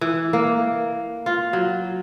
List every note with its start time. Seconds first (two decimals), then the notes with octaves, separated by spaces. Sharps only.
0.01 E3
0.33 A#3
1.26 F4
1.53 F#3